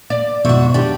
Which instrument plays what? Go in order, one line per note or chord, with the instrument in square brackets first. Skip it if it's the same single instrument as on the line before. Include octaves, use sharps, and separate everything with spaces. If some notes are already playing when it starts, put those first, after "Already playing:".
[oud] D5
[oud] F2 G#2 [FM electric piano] B2 C#6 [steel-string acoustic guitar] F#4 E5
[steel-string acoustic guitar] D4 G4